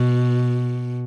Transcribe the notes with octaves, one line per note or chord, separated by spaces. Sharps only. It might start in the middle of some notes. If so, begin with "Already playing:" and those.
Already playing: B2